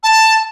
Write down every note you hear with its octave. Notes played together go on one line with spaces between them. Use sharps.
A5